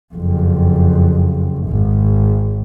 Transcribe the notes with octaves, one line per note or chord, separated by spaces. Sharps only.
F#1 F2
G#1